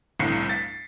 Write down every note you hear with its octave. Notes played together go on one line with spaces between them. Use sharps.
G1 C2 A2 C7 C#7
A6 B6